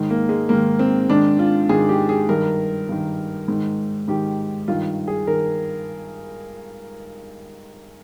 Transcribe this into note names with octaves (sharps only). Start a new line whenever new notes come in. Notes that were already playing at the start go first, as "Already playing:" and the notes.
Already playing: G#2 D#3
A#3
G#3
G#2 D#3 A#3
C4
G#2 D#3 D4
F4
G#2 D#3 G#4
G4
G#4
G2 D#3 A#4
G2 D#3
G#2 D#3
G#2 D#3 G4
G2 D#3 F4
G#4
D#3 A#4